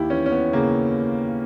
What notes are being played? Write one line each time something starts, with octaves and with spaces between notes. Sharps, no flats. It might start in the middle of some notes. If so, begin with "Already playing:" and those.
Already playing: D#2 E4 G4
E3 C#4
C#4
B3
C#3 A#3